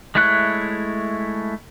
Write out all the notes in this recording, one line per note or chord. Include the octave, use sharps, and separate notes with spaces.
G#3 A3 E4 C#5 F#6